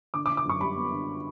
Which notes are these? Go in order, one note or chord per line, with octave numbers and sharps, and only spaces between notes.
D3 D6
D6
D3
D6
F#2 C#6
G3 B5
B3
D3